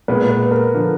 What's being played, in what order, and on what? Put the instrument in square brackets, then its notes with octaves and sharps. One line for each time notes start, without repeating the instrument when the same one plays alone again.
[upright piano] A#2 G#3 B3 [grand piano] B4
[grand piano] B4
A#4
[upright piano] D3 F3